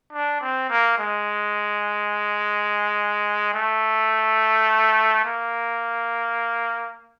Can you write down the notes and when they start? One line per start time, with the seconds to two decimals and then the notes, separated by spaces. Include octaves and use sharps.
0.13 D4
0.41 C4
0.70 A#3
0.98 G#3
3.53 A3
5.25 A#3